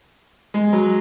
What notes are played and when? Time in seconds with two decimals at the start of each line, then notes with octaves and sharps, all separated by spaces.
0.54 G#3
0.73 F#3